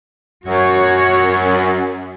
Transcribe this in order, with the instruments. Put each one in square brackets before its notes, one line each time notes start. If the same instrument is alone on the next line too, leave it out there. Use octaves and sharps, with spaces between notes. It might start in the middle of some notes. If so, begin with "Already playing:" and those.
[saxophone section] F#2 [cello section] F#4 C#5